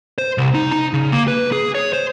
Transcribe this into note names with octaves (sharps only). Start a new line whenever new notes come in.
C5
C2
D#4
D#4
C#3
A#3
B4
G#4
C#5
C5